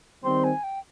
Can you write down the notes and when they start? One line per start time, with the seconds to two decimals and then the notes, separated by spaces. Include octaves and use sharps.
0.23 D#3 G3 C4 C6
0.44 G#5
0.64 G5